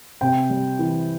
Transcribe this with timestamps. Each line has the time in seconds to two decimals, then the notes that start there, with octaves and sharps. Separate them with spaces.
0.21 C3 G5
0.50 G3
0.79 E3